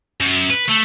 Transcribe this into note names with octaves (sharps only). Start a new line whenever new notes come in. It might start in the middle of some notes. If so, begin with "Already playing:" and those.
F#2
B4
A3